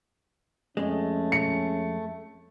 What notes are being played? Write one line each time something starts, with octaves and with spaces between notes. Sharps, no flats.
F2 G#3 A3 C#4
C#7